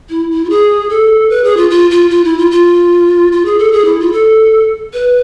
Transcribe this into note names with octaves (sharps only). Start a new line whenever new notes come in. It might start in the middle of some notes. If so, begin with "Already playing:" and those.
E4
E4
F4
G#4
A4
B4
G#4
F4
F4
F4
F4
E4
F4
F4
F4
G#4
A4
G#4
E4
F4
A4
B4